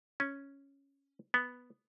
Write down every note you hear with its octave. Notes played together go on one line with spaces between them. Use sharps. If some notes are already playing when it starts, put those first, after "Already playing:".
C#4
B3